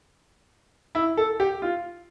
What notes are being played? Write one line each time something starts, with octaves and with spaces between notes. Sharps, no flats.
E4
A4
G4
F4